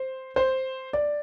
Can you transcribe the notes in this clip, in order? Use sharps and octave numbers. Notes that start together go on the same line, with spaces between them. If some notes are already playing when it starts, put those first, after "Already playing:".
Already playing: C5
C5
D5